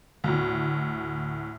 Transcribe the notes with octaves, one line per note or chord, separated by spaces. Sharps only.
D2 A2